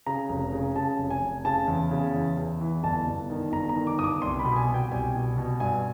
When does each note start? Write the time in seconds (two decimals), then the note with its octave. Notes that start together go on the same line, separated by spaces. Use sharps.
0.07 C#3 A#5
0.29 F1
0.53 C#3
0.76 C#3 A5
0.99 F1
1.10 G#5
1.22 F1
1.45 C#3 A5
1.68 E2
1.91 C#3
2.14 E2
2.37 E2
2.61 E3
2.83 G1 A5
3.07 G1
3.30 D#3
3.52 G1 A#5
3.69 A#5
3.76 D#3
3.87 D6
3.99 G1 D#6
4.04 D6
4.22 C2 C6
4.39 B5
4.45 B2
4.56 G#5
4.68 B2
4.74 G5
4.91 C2 G#5
5.15 B2
5.38 B2
5.60 G2 G#5